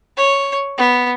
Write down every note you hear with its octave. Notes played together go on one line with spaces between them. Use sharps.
C#5
B3